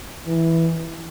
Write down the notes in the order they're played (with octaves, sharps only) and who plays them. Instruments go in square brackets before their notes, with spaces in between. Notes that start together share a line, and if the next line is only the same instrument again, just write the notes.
[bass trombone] E3